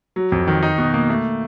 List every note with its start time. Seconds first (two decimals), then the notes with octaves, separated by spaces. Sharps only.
0.16 F#3
0.32 F2
0.47 D#3
0.63 D#4
0.78 B2
0.94 A#3
1.10 A3